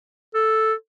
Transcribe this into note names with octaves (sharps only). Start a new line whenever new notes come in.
A4